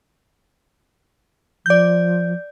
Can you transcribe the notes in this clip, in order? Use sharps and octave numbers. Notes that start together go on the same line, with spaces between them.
F3 D5 G6